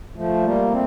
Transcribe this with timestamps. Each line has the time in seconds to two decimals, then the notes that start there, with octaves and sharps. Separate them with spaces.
0.16 F3 A3
0.43 G3 A#3
0.71 A3 C4